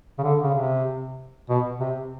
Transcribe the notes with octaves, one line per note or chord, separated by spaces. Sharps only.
C#3
D3
C#3
C3
B2
C3